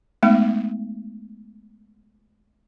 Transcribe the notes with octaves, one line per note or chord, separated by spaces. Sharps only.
G#3 A3 B3 D#4